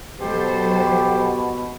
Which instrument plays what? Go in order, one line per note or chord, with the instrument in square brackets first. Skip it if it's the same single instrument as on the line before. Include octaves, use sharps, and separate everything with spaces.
[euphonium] B2 [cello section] F#3 A4 C5 [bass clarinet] G4